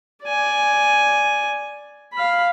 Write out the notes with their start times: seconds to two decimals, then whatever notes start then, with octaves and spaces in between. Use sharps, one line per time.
0.24 D5 G#5
2.13 F5 B5